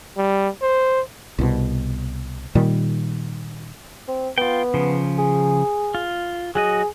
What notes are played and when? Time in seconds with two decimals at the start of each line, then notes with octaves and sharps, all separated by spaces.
0.17 G3
0.62 C5
1.39 C2 B2
2.55 A#2 D#3 G3
4.08 C4
4.38 B3 F4 G5
4.74 C#3 F3
5.18 G#4
5.95 F4
6.55 F#3 F#4 G#4 D#5